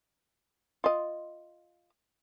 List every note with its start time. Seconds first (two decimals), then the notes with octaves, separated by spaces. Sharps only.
0.84 F4 D#5